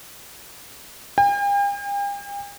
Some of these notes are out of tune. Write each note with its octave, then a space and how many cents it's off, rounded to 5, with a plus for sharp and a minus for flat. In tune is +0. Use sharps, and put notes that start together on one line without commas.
G5 +45